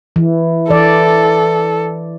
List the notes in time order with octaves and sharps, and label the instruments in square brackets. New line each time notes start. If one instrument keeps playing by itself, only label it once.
[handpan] E3
[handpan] E3 D5 [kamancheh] A4